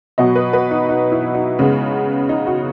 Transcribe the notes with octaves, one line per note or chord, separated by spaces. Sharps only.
B2 F#3 B3 D#5
B4
B4
D#4
D#4
E4
D#4
C#3 G#3 B3
D#4
F#4